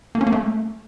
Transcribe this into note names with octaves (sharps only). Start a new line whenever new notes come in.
A#3
C#4
A#3
A3